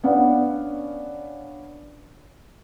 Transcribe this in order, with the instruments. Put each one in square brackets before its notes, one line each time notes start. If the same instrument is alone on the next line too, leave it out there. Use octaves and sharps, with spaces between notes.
[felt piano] B3 C#4 D4 D5 F5 F#5